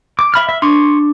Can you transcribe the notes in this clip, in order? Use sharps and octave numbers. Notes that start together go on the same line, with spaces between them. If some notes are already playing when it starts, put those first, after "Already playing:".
D6
E5 B5 F6
E5
D4 C6 C#6